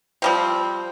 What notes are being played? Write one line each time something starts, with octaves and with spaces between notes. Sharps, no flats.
F3 G3 C4